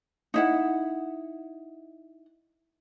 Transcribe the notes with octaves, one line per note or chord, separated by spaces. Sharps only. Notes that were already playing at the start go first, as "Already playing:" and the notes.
D#4 E4 F#5